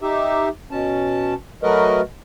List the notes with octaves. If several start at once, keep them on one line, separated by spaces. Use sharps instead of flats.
D#4 G4 E5
B2 C#4 A5
F#3 A3 F#4 A#4 B4 D#5